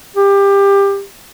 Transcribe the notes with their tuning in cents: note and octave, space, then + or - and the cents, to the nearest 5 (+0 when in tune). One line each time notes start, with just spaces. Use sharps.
G4 +20